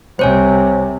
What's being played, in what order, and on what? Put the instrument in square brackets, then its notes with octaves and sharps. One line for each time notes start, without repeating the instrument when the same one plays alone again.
[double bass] C2 C3 [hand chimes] C5 C#5 G#5